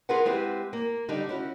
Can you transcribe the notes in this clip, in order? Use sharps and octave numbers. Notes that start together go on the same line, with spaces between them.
F4 G#4 A#4 B4 F#5
G#3 C4 E4 G4 B4
A#3
D3 G3 D#4
C#4 E4 F#4